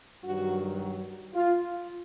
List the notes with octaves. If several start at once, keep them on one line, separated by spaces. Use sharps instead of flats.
G2 D#3 F#3 F#4
F4